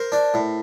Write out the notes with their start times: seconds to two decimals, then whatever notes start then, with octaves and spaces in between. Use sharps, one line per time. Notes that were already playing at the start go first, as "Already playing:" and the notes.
Already playing: A#4 C5
0.12 D4
0.34 A2